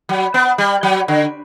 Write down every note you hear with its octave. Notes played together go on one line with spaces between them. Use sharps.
F#3
B3
G3
F#3
D3